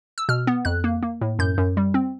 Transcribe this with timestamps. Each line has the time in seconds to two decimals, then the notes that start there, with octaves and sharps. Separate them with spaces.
0.18 E6
0.29 B2 F6
0.47 B3
0.65 F2 F#6
0.84 A#3
1.03 A#3
1.21 A2
1.39 F#2 G6
1.58 F#2
1.77 G3
1.94 C4